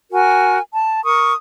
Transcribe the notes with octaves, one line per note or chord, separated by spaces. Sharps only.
F#4 A#4 G#5
A5
A#4 C#6 D#6